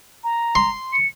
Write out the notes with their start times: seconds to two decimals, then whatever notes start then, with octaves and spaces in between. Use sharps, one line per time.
0.24 A#5
0.55 C6
0.93 C#7